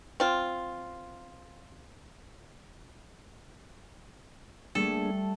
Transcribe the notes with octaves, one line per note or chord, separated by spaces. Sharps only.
C4 F4
G3 A3 A#3 D4 G#4 A4